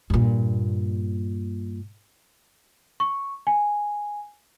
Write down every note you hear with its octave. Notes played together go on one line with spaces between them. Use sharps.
G2 A#2
C#6
G#5